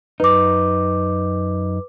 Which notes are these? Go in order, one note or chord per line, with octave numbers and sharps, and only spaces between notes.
F#2 D#4 B4 D6